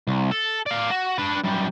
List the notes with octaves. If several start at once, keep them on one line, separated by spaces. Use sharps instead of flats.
C2
A4
D5 F5
F#4
D4 B4
F#2 G3